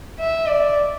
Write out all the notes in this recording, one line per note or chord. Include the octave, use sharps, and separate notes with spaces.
E5
D5